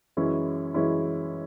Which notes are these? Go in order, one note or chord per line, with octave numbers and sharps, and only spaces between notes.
F#2 E3 G#3 C#4 E4
F#2 E3 G#3 C#4 E4